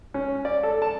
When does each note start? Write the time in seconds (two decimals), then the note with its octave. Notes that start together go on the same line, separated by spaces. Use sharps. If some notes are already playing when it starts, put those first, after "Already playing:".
0.14 C#4
0.45 D5
0.63 A4
0.82 A5